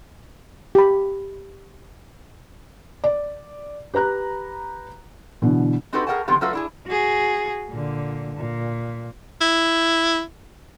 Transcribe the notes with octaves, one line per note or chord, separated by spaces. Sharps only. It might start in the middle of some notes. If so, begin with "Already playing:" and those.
G4 B5
D5
G4 B4 A#5 F#6
B2 D3 E3
C4 D#4 F#4 G4 A4 B4
G#4 A#4 D5 F#5 G5 A5
D3 D#3 F3 B3 C4 G4
F#3 A3 F4 F#4 A4 B4
D4 E4 G#4
F#4 G#4
A#2 D3
A#2
E4